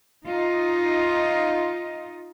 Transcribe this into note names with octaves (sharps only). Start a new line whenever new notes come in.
D#4 F4 D#5